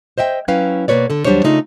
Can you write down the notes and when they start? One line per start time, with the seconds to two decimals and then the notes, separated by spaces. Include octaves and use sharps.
0.18 C5 D#5 E5 G5
0.48 F#3 C#4 E4 B4 F5 G5
0.88 B2 A#3 B4 C#5 D5
1.10 D3 A4
1.25 D#2 F#3 G3 D4 C5 C#5
1.44 C#3 A3 D4 D#4 F4